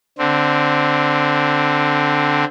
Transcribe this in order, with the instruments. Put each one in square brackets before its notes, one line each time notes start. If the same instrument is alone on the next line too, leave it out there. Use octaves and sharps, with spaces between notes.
[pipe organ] D3 C4